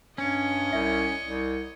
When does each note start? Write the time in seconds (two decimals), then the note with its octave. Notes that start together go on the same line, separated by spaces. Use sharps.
0.18 G2 C#4 C#5 D#5
0.73 C2 E5
1.26 C2